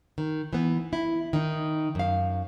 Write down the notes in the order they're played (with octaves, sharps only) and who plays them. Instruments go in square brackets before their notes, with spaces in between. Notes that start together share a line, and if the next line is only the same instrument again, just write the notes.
[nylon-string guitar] D#3
E3 B3
E4
D#3 D#4
F#2 F5